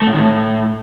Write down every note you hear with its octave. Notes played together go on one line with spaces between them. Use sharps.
A3
A2
D#3
A2